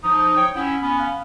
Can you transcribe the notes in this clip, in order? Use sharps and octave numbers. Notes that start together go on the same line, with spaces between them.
F3 D#4 D#6
C#5 G5
C#4 E4 F#5
B3 C#4 B5
F5